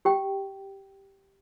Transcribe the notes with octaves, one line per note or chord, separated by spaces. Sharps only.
G4 G5